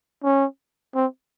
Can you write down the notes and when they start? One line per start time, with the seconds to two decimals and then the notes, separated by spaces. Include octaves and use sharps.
0.24 C#4
0.95 C4